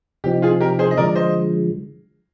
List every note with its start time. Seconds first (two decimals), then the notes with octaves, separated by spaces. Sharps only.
0.24 C3 F3 C4 D#4 G4
0.42 F4 G#4
0.60 G4 A#4
0.79 G#4 C5
0.91 D#5
0.97 D3 F3 G#3 A#4 D5
1.16 C5 D#5